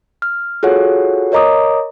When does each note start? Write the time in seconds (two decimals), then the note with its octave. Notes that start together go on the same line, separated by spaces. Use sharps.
0.22 F6
0.63 F4 F#4 G#4 A4 C#5 F#5
1.32 A#4 C#5 D#5 A#5 D6 D#6